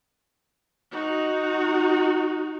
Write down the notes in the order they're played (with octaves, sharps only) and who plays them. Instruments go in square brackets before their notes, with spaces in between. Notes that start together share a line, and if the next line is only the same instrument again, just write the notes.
[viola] D#4 F#4